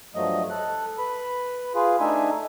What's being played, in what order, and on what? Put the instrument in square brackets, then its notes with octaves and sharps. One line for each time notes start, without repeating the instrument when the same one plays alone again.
[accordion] G2 F3 F#3 A3 D#5
A4 F#6
B4 B5
F4 G#4 B4
A3 D4 D#4 E5 G#5